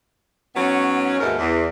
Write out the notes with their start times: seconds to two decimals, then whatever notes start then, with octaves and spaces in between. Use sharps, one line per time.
0.55 G#2 F#3 B3 C#4
1.20 D#2 G#2 B2 G#3 A3 A#4
1.38 E2